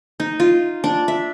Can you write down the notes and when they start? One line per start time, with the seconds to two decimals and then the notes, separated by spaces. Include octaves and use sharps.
0.20 D#4
0.40 F4
0.84 D4
1.08 E5